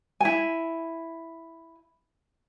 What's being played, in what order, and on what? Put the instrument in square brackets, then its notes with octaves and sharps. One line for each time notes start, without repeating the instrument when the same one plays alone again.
[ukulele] E4 G#5